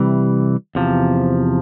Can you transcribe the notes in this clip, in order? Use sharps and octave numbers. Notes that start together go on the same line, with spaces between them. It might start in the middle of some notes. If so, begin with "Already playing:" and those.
Already playing: C3 E3 G3
E2 C3 F3